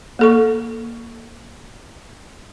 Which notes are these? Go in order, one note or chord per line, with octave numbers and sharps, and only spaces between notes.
A#3 A4 C#6